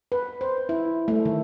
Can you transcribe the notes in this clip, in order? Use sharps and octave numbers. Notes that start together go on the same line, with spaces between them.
B4
C5
E4
A3
D#3